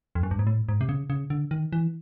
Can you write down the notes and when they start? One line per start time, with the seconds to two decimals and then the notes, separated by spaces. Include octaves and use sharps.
0.15 F2
0.23 F#2
0.31 G2
0.39 G#2
0.47 A2
0.69 G#2
0.81 C3
0.89 C#3
1.10 C#3
1.30 D3
1.51 D#3
1.73 E3